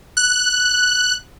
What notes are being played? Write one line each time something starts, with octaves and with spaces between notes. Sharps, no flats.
F#6